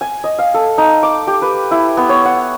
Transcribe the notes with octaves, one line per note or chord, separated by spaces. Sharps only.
G#5
D#5
F5
A4
D#4
D6
G4
B4
E4
B3
C#5
F#5